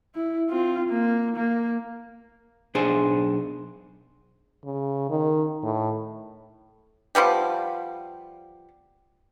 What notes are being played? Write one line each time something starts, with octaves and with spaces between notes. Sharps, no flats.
E4
C4 F4
A#3
A#3
B1 D4 G#4 C5
C#3
D#3
A2
F3 G3 B3 G4